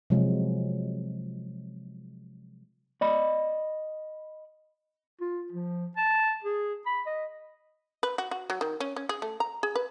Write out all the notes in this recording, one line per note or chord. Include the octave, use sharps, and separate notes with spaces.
C3 F3 F#3 G#3
D5 D#5 B5
F4
F3
A5
G#4
B5
D#5
B4
F#4
F#4
F#3
D#3
C#4
C#4
G#4
A3
A#5
G#4
B4